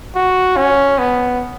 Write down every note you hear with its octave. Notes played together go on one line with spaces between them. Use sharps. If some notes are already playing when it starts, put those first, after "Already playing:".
F#4
C#4
B3